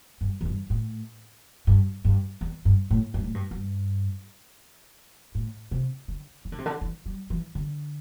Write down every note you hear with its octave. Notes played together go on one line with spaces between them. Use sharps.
G2
E2
G2
A2
G2
G2
E2
G2
A2
G2
A2
G2
G2
A2
C3
D3
E3
D3
C3
D3
E3
G3
E3
D3